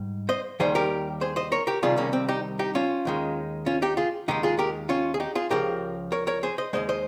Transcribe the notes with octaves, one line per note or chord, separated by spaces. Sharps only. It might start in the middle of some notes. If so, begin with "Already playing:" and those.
Already playing: G#2 G3
C5 D#5
D#2 D#3 G3 G#4 C5
G4 A#4
G#4 C5
C5 D#5
A#4 C#5
G4 A#4
C2 C3 D#3 G3 F4 G#4
A#3 C#4
C4
D#4 G4
D#4 G4
C#4 F4
D#2 D#3 G#3
C#4 F4
D#4 G4
F4 G#4
D#2 D#3 G#3 D#4 G4
F4 G#4
G4 A#4
C#4 F4
G#4
D#4 G4
F4 G#4
C#2 C#3 F3 G4 A#4
A#4 C#5
A#4 C#5
G#4 C5
C5 D#5
D#2 D#3 G#3 C5 D#5
C5 D#5